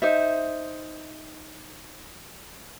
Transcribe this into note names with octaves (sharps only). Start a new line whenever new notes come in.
D#4 C5 E5